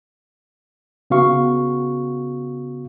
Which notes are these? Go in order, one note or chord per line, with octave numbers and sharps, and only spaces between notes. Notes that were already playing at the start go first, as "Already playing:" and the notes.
C#3 B3 F#4 F5 C#6